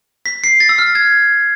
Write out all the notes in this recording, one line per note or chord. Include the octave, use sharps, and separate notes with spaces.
B6
C7
A6
E6
F6
G#6